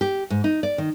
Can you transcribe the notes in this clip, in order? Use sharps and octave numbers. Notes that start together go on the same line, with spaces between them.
G4
G#2
D#4
D5
D#3